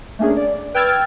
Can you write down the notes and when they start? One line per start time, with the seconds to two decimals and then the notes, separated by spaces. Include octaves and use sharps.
0.19 A3 A#3 C#4 D4 G#4
0.37 D5
0.74 B4 G5 E6 F6 G#6 A6